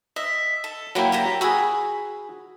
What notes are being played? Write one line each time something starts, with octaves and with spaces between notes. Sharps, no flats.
D#5 E5
A4
F#3 A#3 E4 G5 B5
G4 A4 A#5
F#4 G#4 B5 E6